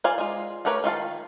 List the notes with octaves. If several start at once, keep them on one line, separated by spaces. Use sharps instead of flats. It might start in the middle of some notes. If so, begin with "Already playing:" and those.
F4 C5 D5 F5 G#5
G#3 F4
A3 G4 A#4 B4 C#5
D#3 F4 F5 A5